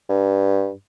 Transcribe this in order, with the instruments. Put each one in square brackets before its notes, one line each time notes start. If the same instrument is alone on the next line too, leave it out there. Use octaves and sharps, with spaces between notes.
[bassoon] G2